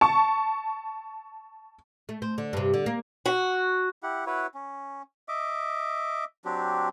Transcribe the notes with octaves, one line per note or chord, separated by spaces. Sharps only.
A5 C#6
A3
C4
D3
G2 C3
D3
A#3
F#4
E4 G4 F#5
E4 F#4 B4 C#5
C#4
D#5 E5 D6
F#3 C4 D4 G4